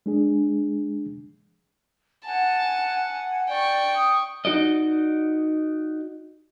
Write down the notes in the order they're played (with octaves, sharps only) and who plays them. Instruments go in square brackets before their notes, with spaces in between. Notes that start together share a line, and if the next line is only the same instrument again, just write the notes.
[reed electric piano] G#3 D4 G#4
[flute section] F#5 G#5 [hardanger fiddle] A5
[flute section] D5 [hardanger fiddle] G5 C#6
[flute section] D#6
[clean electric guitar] D#4 F#4 D5 D#5